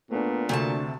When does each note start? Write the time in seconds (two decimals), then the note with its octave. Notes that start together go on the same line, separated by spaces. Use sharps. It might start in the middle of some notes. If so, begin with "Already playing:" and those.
0.11 A#2 A3 B3 D4
0.49 D2 C3 A3 D4 F#4 A5